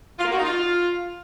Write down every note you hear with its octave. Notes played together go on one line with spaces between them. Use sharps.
F4
A#3
F#4
D#4
F4